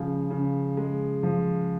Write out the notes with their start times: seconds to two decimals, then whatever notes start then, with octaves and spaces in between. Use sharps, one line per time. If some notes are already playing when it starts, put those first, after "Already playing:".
Already playing: C#3 F3 G#3
0.30 C#3
0.77 G#3
1.23 F3